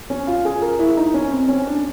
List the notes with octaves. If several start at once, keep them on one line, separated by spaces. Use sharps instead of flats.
C#4
F4
G#4
A#4
E4
D#4
C#4
C4
C#4
D4